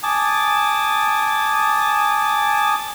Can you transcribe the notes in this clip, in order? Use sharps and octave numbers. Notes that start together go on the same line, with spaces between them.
G#5 A5 D6 D#6